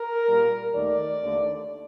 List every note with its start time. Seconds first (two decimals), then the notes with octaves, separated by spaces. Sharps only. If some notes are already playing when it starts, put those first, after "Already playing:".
Already playing: A#4
0.28 A#2 G3 A#3
0.74 D#2 D#3 A3 D5
1.21 D#2 D3 A3